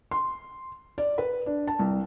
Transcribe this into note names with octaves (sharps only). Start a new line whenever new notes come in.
C6
D5
B4
D4
A5
C2